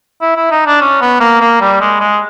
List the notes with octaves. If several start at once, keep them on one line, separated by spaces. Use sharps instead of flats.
E4
E4
D#4
D4
C#4
B3
A#3
A#3
G3
G#3
G#3